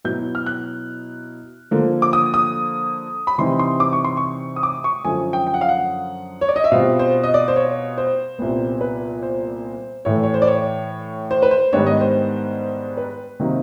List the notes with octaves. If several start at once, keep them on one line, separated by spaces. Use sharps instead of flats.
B2 F#3 B3 E4 G6
F6
F#6
D3 F3 A#3
D6
D#6
D#6
B5
C3 E3 G3 C4 D#4 C6
C6
D6
C#6
C6
C#6
D#6
D6
C#6
F#2 D3 F3 G#5
G5
G5
F#5
F5
F#5
C#5
D5
D#5
E5
B2 G3 C4 F4 F5
C5
D#5
D5
C5
C#5
C5
C2 A#2 G3 B3
B4
C5
A2 E3 A3 C#5
C#5
C5
D5
C#5
C5
B4
C5
G#2 D#3 G3 B3 D4 C#5
D#5
C5
B4
C3 D#3 F#3 A#3 D#4